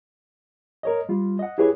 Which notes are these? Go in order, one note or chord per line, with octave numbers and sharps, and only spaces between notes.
A#4 C#5 D#5
G3 F4
D#5 F#5
E4 G4 G#4 B4 C#5